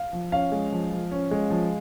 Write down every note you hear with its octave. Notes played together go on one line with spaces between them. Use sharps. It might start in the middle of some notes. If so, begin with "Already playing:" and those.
Already playing: F5
F3
C#4 F5
G#3
F3
F3
C#4
G#3
F3